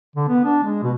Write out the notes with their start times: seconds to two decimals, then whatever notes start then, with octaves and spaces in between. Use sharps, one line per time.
0.16 D3
0.28 B3
0.44 D4
0.64 G#3
0.83 B2